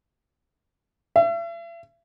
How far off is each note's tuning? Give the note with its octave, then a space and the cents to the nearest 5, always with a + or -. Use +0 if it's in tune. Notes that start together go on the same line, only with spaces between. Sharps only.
E5 +40